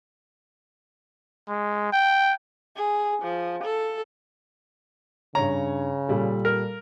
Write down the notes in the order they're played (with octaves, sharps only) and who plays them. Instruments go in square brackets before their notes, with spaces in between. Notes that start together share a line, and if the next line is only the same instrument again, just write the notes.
[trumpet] G#3
G5
[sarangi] G#4
F3
A4
[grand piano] G2 C#5 [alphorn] C#3 [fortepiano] A#5
[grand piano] A#2 G3 A4
[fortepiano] A#4